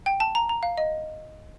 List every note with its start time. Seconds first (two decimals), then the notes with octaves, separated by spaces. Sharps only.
0.06 G5
0.20 A5
0.35 A#5
0.49 A#5
0.63 F5
0.78 D#5